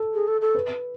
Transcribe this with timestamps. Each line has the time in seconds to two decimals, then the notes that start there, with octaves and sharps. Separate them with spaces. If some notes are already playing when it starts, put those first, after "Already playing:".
Already playing: A4
0.14 G#4
0.28 A4
0.41 A4
0.55 B4